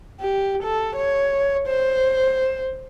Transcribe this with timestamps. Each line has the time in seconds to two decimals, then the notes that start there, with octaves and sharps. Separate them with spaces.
0.21 G4
0.63 A4
0.96 C#5
1.68 C5